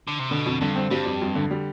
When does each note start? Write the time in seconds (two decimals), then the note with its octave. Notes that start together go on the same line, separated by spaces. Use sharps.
0.08 D3
0.19 C3
0.31 B2 D3
0.46 F2
0.61 G2 D3
0.76 C4
0.91 G2 G3
1.06 F2
1.22 F2
1.35 D3
1.51 G3